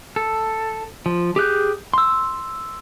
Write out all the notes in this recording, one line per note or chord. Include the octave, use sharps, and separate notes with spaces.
A4
F3
G4 G#4 F#6 G6
C6 E6